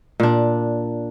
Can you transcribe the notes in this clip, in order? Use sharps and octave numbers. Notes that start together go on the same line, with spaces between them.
A#2 D4